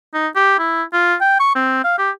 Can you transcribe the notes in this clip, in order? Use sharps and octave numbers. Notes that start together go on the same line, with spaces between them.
D#4
G4
E4
F4
G5
C#6
C4
F5
G4